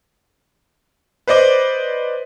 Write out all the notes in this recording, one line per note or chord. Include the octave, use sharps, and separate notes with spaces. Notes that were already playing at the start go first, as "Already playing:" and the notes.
B4 C5 D5 D#5 D6